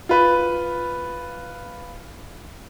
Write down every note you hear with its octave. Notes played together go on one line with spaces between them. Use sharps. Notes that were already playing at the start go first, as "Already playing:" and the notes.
F4 B4